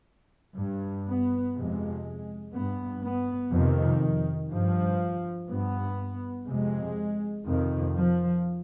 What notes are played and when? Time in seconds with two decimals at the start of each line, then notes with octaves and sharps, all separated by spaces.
0.58 G2
1.08 B3
1.56 F2 C3 G#3
2.54 G2 B3
3.03 B3
3.52 F2 C3 D#3
4.50 G2 F3
5.48 G2 B3
6.47 F2 C3 G#3
7.45 F2 C3 D#3
7.95 F3